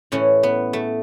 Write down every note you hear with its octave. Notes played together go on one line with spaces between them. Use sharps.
A2 E3 C#4
B3
A3